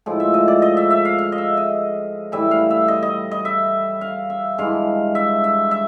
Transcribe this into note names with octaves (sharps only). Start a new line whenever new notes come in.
A2 F3 G#3
E5
D#5
D5
D#5
E5
E5
F5
F5
D#5
E5
D#5
A2 E3 G3 E5
F5
E5
D#5
D#5
D#5
E5
F5
E5
G2 E3 G#3 F5
E5
E5
E5